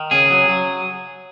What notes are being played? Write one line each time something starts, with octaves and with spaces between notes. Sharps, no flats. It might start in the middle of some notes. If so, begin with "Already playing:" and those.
Already playing: D#3
C#3 G#4
F#3
F#3